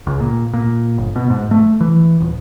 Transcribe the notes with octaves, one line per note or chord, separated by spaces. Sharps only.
C#2
A#2
A#2
G1
B2
G#2
A3
E3
D#1